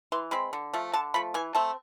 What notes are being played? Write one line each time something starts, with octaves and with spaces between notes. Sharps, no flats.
E3 C6
G#3 C4 B5
D3
F3 A3
D3 A5
F3 A3 B5
E3 G#5
A3 C4 A5